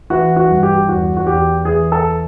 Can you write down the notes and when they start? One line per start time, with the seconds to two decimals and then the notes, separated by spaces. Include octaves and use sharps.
0.10 E3 F#4
0.36 F#4
0.49 G2
0.63 G4
0.88 E2 F#4
1.17 F#4
1.27 E2 G4
1.65 E3 G#4
1.92 A4